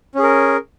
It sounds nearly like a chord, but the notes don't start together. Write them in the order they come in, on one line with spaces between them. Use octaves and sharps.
C#4 G#4 A#4